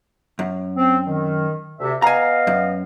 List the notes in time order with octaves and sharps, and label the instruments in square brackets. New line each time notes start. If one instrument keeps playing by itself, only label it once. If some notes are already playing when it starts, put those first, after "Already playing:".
[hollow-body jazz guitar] F#2
[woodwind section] C4
D#3
D2 C3 E5
[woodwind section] B3 D#5 F5 [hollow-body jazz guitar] G#5 A#5
[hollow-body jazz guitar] F#2